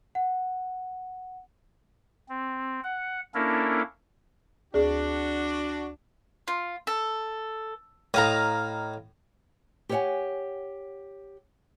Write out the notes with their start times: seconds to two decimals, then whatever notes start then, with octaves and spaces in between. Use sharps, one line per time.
0.15 F#5
2.29 C4
2.83 F#5
3.35 A#3 C#4 D4 E4 A4 A#4
4.74 D2 D4 F#4 G#4 D5
6.48 F4
6.87 A4
8.14 A2 D#5 F5 A#5
9.89 G4 C5 C#5 E5 F#5 G#5